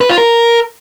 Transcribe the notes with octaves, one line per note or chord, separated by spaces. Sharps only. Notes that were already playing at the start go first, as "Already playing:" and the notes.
B4
F4
A#4